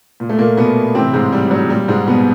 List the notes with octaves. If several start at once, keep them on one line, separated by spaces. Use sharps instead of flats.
A#2
A3
A#2 A#3
B2 B3
A2 C3 E3 C4
G#2 G#3
G3
F#3
A#2 G3
G#2 G#3
B2 B3